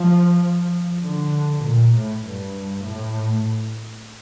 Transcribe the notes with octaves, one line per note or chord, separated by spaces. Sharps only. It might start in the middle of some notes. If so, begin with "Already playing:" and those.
Already playing: F3
D3
A#2
A2
G2
A2